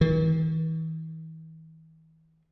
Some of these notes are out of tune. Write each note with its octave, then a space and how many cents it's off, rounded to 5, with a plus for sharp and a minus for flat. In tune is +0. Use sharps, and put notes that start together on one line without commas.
E3 -45